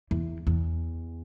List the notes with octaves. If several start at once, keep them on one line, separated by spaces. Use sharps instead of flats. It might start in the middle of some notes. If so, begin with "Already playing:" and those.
E2
E2